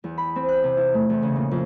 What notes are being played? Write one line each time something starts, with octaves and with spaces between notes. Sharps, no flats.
E2
B5
C4
F#6
C3
E4
A3
E2
C#3
A#2
F2